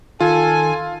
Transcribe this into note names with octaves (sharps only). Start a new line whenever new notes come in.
D#3 F4 A4 G#5